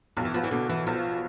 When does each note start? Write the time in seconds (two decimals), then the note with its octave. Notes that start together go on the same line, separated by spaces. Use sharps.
0.17 B1 F2
0.25 E3
0.34 F3 B3
0.44 E3
0.51 B2 D3
0.69 E3 B3
0.86 B1 F3